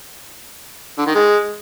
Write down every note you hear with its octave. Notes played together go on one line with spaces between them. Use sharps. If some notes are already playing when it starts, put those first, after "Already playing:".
D3
D#3
G#3